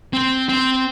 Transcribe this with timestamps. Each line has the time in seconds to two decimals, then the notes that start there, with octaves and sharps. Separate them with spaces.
0.13 C4
0.49 C4